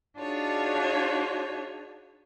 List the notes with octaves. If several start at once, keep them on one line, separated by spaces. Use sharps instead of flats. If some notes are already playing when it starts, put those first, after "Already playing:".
D4 D#4 F4 F#4 G#4 C#5